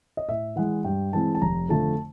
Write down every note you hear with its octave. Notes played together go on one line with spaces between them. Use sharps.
D#5
A2 E5
E3 G#3 F#5
G2 G5
E3 G#3 C4 A5
A5
F1 A#5
F2 D3 F3 A3 A5